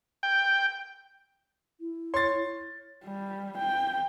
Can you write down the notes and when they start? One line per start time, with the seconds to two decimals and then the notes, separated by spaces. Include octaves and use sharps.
0.23 G5
1.80 E4
2.14 C#5 C6 A6
3.05 G3
3.58 G5